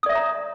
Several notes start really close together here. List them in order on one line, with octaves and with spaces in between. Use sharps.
D#6 D5 E5 C#5 A#5